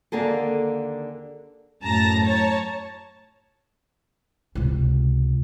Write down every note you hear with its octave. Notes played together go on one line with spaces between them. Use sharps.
D#2 D3 A#3 G#4 A4
F#2 A2 A5 A#5 A#6
C#5 A5 A#5
C#2 C3